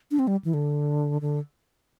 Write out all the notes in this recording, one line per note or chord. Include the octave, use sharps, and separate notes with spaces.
D4
C4
G3
E3
D3
D3